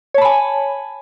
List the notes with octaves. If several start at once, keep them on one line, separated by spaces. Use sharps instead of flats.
C#5 G#5 A5 B5